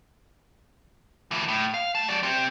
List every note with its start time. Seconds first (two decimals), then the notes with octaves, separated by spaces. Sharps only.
1.31 D3 E3
1.48 A2
1.74 F5
1.95 A3 A5
2.09 F#3 D5
2.23 C4 G4